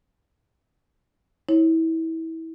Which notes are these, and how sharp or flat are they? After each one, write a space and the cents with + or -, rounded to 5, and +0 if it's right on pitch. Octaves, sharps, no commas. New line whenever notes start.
E4 -25 C#5 -25